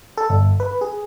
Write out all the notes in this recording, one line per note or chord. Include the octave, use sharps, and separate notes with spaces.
A4
G1
B4
G#4